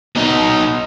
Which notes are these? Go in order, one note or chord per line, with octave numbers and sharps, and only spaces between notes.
B2 D#4